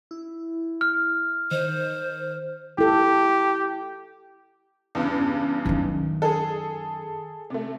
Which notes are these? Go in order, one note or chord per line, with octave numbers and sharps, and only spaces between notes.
E4
F6
D#3 C5
E4 G4 A4
E2 G2 C#3
F#2 D#3
G#4 A4
C3 A3